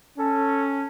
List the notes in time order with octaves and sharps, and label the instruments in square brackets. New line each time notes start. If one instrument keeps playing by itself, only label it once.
[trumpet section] C#4 [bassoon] A4